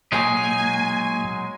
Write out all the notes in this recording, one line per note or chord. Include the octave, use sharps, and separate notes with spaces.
A#2 F#3 G#3 D#4 G#5